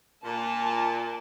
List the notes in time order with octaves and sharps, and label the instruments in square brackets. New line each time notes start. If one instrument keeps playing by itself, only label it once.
[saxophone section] A#2 [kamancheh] A5